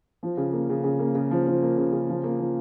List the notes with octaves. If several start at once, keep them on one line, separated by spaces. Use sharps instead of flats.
F3
C#3
A#3
C#3
C#3
A#3
C#3
F3
F3
A#3
C#3
C#3
F3
A#3
F3